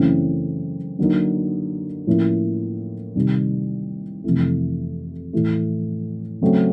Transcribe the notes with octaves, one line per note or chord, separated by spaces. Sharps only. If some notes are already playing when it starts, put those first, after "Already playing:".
Already playing: F#2 C#3 E3 A3 C4
D3 F#3 A#3 D#4
A2 F3 A#3 C#4 E4
C3 D#3 G3
F2 C3 E3 A3
A2 E3 A3
C#3 F#3 A3 C4